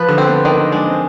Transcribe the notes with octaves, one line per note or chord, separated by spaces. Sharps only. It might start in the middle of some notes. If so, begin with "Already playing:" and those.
Already playing: F3 B4
D3
C4
B3
D#3 D4
D#4
G#3 D4
C4